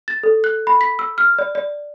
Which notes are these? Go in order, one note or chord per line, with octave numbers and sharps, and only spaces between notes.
A6
A4
F#6
B5
B6
E6
F6
D5
D5